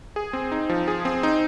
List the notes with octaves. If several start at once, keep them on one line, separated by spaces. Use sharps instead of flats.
G#4
C4
D#4
F3
G#4
C4
D#4